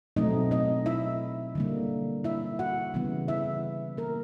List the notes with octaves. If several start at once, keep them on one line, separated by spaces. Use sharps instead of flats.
B2 F#3 A3 C4 D#4 D#5
D#4 D#5
E4 E5
D3 G3 A#3
E4 E5
F#4 F#5
C#3 E3 G3 B3
E4 E5
A#3 A#4